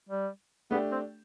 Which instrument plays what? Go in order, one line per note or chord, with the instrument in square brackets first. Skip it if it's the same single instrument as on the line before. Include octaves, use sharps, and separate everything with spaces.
[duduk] G3
[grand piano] A3 D4 G4 [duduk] B3
[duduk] C4